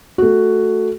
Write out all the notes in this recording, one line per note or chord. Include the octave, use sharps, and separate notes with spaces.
A3 F#4